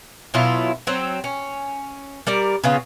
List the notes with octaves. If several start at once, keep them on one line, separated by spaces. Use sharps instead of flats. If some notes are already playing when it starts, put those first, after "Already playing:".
B2 F#3 E4 F4
F#3 C4
C#4
G3 A#4 D5
C#3 B3 F4